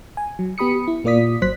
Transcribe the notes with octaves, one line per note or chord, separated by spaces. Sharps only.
G#5
F#3
B3 G4 B5 D#6 C#7
E4
A#2 A#3 F4 D5 D#6 B6
G#1 F#3 C5 F#6 B6